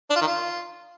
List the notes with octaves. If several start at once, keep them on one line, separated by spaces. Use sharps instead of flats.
D4
F4
D#3
F4